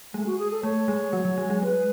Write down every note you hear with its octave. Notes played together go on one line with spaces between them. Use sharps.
G#3 A3
F#4
G#4
A4
A3 C#5
G#3
F#3
F#3
G#3
G#3
G#3 B4